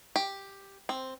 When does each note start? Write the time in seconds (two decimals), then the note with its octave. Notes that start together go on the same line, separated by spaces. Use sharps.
0.16 G4
0.89 C4